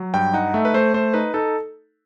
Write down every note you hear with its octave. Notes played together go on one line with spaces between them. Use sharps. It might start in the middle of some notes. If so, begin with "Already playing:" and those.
Already playing: F#3
G2 G5
D#4 F#5
A3 E5
B4
A3 C5
A3 C5
D#4 B4
D#4 A4